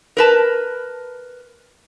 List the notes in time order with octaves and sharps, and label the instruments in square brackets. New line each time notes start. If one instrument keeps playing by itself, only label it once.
[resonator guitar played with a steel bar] A#4 B4 A5